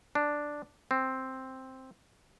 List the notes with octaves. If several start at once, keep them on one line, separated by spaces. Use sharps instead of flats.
D4
C4